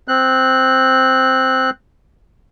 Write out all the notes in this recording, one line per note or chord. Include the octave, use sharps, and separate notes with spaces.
C4 F#6